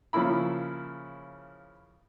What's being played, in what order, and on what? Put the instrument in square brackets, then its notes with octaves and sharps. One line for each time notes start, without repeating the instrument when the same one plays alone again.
[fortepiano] C#3 F3 A#3 E4 B5